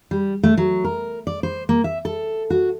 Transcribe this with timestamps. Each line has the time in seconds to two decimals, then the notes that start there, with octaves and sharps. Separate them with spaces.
0.11 G3
0.43 A3
0.58 F#3
0.84 A#4
1.27 D5
1.43 C5
1.69 A#3
1.84 E5
2.05 A4
2.50 F#4